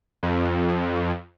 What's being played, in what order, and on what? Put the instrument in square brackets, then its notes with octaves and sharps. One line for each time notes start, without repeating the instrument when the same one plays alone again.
[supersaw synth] F2